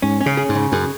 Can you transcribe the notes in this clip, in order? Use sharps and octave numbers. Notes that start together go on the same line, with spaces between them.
G#2 C#4
C#4
C#3
G#4
G#2
C#3
F#2 G#4